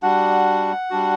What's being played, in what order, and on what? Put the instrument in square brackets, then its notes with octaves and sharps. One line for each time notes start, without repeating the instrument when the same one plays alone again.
[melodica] G3 D4 F#4 F#5
G3 D4 F#4